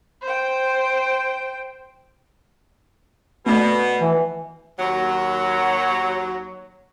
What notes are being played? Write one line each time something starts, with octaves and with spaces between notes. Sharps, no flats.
C5 G5
B2 A3 D5
E3
D#2 F#3